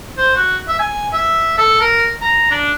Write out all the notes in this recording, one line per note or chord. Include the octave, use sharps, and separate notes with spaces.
C5
F#4
E5
G#5
E5
A4
A#4
A#5
D4